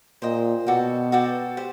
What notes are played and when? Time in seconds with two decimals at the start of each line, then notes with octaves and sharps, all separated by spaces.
0.22 A#2 C5 D#5 G5
0.67 B2 F#4 A4 D5 G5
1.12 F#4 A4 D5 G5
1.57 G4 C5